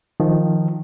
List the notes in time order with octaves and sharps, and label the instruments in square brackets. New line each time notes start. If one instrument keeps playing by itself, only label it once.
[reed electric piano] D#3 F3